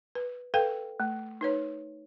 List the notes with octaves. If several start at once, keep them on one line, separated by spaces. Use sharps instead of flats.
B4
A4 B4 F5 G5
A3
D#4 B4 C#5